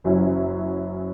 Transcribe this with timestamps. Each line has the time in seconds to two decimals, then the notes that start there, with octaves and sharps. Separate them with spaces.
0.04 F#1 F#2 F#3 C#4 E4